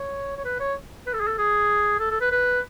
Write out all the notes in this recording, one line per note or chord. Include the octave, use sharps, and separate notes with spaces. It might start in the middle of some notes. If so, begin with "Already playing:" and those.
Already playing: C#5
C#5
B4
C#5
B4
A4
G#4
A4
G#4
A4
A4
B4
B4